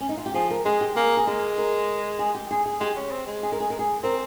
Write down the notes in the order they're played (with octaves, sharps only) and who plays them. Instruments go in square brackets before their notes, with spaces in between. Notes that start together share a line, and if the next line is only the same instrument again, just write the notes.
[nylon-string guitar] C#4
D#4
F4
G4
[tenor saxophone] F3 [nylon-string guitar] G#4
[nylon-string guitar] A#4
[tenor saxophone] G#3 [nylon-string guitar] G#4
[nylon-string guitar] G4
[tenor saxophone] A#3 [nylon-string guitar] G#4
[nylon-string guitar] G#4
[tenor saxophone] G#3 [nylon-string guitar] A#4
[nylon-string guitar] A#4
G#4
G4
G#4
G#4
[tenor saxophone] G#3 [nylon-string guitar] G4
[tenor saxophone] C#4
C4
G#3
[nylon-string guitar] G#4
A#4
G#4
A#4
G#4
[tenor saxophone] C4 [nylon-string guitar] A#4